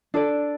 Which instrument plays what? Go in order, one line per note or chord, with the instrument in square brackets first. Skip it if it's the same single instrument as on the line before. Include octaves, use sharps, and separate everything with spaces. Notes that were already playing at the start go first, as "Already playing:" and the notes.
[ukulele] D4 A4 D5